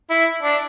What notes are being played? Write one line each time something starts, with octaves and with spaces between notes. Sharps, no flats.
E4
D4